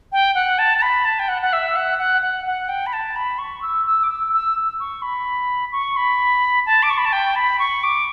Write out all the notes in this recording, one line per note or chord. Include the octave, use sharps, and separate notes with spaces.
G5
F#5
A5
A5
B5
A5
G5
F#5
F#5
E5
F#5
F#5
F#5
F#5
G5
B5
A5
B5
C#6
E6
E6
D6
E6
E6
C#6
B5
C#6
B5
A5
D6
C#6
B5
A5
G5
B5
C#6
D6